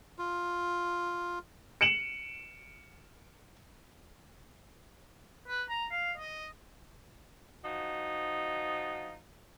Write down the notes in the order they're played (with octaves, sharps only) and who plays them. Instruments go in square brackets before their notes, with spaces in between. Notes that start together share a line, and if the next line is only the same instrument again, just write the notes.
[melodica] F4
[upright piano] C#7 D7 E7 F#7
[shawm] B4
A#5
F5
D#5
[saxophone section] F3 D#4 F#4